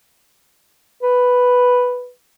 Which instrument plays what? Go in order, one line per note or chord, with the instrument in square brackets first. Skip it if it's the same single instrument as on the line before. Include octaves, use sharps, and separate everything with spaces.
[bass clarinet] B4